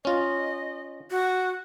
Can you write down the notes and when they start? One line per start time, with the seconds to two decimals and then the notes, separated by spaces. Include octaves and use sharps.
0.05 C#4 F4 D#5
1.11 F#4